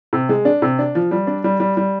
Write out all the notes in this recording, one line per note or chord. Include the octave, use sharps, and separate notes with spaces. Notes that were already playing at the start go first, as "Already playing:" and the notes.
C3
G#3
D4
C3
D4
F3
G3
D4
G3
G3
G3